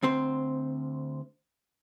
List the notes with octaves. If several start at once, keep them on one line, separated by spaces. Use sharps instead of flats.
D2 C4 C5